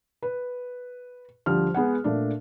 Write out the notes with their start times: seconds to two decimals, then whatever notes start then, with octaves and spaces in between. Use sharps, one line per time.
0.22 B4
1.46 D2 F3 G3 G4 F6
1.74 G#3 B3 G#4 F#5
2.04 A#2 A3 D4